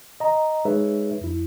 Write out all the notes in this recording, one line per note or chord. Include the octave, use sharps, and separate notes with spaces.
D#5 A#5
G#3 D#4 G#4 B4 C#5 E5
F2 E4